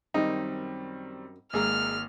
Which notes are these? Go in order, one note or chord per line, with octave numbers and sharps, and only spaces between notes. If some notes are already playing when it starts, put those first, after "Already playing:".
F#2 D#3 G3 C4 D#4
G#1 G#3 A#3 G#4 A#4 E6 F6